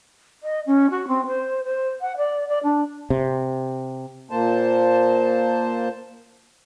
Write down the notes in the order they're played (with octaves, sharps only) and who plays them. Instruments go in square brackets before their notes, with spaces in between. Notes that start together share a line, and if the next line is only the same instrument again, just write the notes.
[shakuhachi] D#5
C#4
F#4
C4
C5
C5
F#5
D5
D5
D4
[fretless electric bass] C3
[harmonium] A#2 A#3 C5 A5